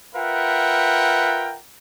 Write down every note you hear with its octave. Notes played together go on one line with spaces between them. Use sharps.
F4 A#4 B4 E5 F#5 G5